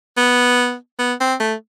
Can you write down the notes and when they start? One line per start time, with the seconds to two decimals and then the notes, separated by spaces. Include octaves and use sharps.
0.17 B3
0.99 B3
1.20 C4
1.40 A3